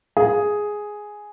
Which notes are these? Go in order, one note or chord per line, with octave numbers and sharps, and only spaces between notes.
G#4